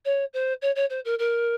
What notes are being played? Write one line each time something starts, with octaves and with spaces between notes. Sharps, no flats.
C#5
C5
C#5
C#5
C5
A#4
A#4